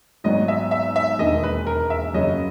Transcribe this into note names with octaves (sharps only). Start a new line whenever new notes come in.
G#1 G#2 F#3 B3 D#5
E5
E5
E5
E1 D#2 D#3 G#3 D#5
B4
A#4
E5
F#2 C#3 F#3 C#4 D#5